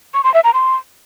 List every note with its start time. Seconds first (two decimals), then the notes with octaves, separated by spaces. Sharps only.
0.14 C#6
0.24 C6
0.34 E5
0.44 A#5
0.54 C6